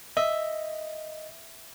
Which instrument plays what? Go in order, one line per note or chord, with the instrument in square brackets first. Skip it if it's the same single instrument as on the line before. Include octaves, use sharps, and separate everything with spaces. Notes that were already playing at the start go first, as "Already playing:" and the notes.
[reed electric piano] D#5 [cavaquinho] E5